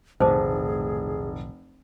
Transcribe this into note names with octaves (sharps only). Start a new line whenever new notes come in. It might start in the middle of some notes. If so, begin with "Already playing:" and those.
F1 B1 A2 D#3 G#4 C5 A5 D6